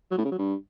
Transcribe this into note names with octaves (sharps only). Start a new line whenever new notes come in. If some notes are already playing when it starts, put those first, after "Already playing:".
F#3
A2
C#3
F#3
G2